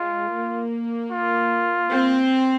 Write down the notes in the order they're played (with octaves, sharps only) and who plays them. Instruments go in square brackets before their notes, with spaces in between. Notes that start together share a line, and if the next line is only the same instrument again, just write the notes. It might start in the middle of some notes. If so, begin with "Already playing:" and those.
Already playing: [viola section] G#3 [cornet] F4
[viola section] A#3
[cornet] F4
[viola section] C4